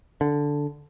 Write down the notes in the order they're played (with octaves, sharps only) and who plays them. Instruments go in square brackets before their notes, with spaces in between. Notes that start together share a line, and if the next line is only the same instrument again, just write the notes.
[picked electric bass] D3